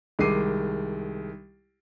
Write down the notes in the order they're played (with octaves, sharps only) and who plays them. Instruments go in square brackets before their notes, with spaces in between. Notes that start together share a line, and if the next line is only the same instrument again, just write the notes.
[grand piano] C2 D#3 G#3 D6 C7 D#7